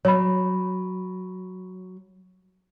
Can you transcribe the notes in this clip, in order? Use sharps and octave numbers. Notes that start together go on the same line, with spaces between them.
F#3 C#5 B5